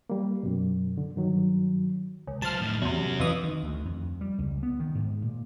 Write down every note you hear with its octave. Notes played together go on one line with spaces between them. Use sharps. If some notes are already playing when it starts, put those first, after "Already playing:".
G3 A#3
F#2 B2
D3
G2 D#3 F#3
C#2
F#3 C5 A5 F6
F2 A2
E2 C3 C#4 F#4
F2 E3 D#6
D#3
D2
F2
G3
C#2
B3
D#3
G#2
A#2